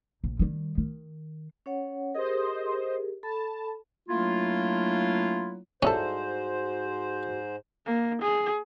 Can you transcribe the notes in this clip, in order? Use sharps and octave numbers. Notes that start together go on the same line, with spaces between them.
A#1
D#3 G3
D#3
C#4 C#5 F#5
G4 G#4 A#4 C5 D#5
A4 A5 B5
F#3 A3 A#3 D4 E4 F4
G#2 G3 C#4 E4 F#4 A4 C5
A#3
G#4